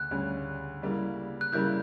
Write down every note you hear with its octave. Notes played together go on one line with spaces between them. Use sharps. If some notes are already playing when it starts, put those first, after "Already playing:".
Already playing: D2 C#3 F#6
D2 C#3 G3 C#4
C#3 G3 A#3 E4
F#6
C#3 G3 A#3 E4 G6